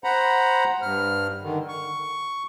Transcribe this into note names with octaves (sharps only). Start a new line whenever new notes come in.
C5 F#5 A#5 B5
G2 F6
D3 D#3
C#6